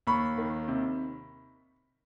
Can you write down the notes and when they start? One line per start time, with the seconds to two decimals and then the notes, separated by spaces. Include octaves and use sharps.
0.07 D#2 B5 C#6
0.38 D#3
0.68 C3